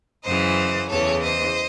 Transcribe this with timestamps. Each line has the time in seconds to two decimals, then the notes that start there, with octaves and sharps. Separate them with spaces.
0.25 F#2 C#3 E3 C5 D#5
0.90 E2 C#3 E3 A4 C#5
1.23 C5 D#5